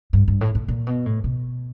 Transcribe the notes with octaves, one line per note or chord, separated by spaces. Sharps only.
G2
G2
A2
A2
A#2
B2
A2
B2